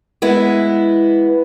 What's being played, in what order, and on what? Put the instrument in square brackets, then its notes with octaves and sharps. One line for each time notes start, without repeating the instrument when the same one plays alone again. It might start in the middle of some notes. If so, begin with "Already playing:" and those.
[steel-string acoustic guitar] G#3 B3 E4